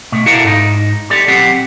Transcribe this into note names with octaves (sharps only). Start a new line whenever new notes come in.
B2 A3
E4 F#4 A4 A#4 D5 F5
G#2 D#4
G4 A4 D5
B1 C4 G4 F#5